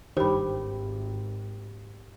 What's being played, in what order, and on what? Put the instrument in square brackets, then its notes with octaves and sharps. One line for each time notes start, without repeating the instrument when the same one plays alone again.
[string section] G#1 [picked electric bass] G2 D#3 [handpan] G4 [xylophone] C5 B5